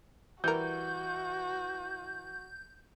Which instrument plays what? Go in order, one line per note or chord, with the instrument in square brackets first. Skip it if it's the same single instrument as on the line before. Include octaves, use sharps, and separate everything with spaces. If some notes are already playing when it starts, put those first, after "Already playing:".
[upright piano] E3 [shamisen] G3 A#4 [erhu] F#4 [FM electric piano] G6